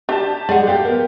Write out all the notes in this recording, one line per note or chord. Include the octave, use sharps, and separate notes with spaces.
D4 G4 A5
G#3 G#4 D5 F#5
G4 A4 F5 G5
B3 A#4